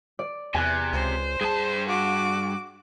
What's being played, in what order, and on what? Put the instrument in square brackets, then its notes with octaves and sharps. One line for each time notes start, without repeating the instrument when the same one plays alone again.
[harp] D5
[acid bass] E2 [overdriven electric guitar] C3 [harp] G#5 F#6
[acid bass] C#2 [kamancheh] C5
[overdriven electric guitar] G2 A5 [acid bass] G#4
[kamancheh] F#4 D6